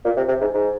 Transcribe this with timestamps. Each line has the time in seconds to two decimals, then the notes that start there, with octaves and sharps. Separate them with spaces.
0.05 A#2
0.17 C3
0.28 C3
0.41 G#2
0.54 G#2